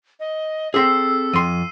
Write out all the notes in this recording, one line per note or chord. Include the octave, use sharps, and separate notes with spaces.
D#5
C4 G#4 A4 E6 B6 C7
F2 C6 D#7